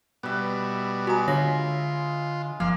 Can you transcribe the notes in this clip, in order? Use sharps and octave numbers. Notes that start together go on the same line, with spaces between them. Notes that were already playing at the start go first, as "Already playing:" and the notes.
B2 G3 B4 E5
G#3 F#4 A#5
D3 F4 C#5 E5 A#6
F#1 F3 A#3 F5